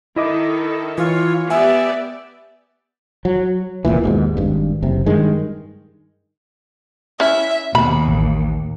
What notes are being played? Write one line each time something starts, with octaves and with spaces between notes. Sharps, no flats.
D#3 E4 A4 D#5 D6
E3 F4 C#5
B3 G4 D5 E5 G#5
F#3
F1 C#2 A#2 E3
D#2 G#2 B2
G#1 G2
F#1 C3
G2 D#3 G#3
C#4 E4 E5
D#2 B2 B5
A1